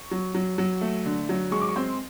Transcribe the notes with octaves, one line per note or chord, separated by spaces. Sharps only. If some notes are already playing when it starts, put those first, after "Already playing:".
Already playing: C#6
F#3
F#3
F#3
A3
D3
F#3
G#3 C#6
D6
C#6
C4 C6